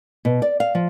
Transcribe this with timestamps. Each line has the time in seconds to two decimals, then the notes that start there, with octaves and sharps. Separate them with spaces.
0.25 B2
0.42 D5
0.60 F5
0.75 F3